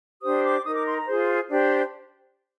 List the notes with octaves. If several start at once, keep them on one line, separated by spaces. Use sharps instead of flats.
D4 G4 C5 D#6
D6
D#4 A#4 D#6
D6
C6
A#5
F4 G#4 C5
D4 G4 C5